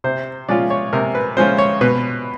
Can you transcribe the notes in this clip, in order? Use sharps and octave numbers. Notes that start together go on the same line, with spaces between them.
C3 C5
F3 G#3 C#4 F4 D5
C#5
C3 A#4
B4
F3 G#3 C#4 F4 C5
C#5
B2 B4